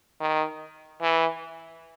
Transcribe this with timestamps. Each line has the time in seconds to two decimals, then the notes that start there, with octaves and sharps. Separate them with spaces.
0.20 D#3
1.02 E3